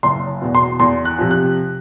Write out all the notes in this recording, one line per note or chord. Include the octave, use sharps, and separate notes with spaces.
F#1 C6
E2 B2
C6
E2 C6
F#6
C3 F3
F#6